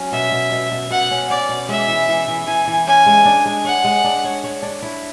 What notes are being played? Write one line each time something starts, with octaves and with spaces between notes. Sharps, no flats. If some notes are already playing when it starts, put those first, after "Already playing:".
Already playing: F#3 C#4
B2 E5
B2
B2
B2
B2 F#5
C#4
C#4 D5
B2
G#3 E5
E3
E3
E3
E3 G#5
E3
C#4 G#5
G#3
D4
G#3
C#5 F#5
G#3
D4
C#5
C#5
D4
E4